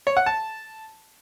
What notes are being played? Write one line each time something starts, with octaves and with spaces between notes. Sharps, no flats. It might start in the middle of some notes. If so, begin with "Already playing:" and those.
C#5
F#5
A5